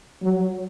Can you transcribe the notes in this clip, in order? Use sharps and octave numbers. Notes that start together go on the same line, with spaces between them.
F#3